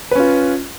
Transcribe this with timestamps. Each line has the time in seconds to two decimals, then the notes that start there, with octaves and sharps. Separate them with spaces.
0.11 B4
0.15 C#4
0.20 F4